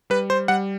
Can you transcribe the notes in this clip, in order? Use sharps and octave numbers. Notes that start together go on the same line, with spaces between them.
G3 B4
C5
G3 F#5